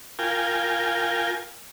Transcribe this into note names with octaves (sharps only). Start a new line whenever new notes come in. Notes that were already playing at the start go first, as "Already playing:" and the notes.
F4 A#4 G5 G#5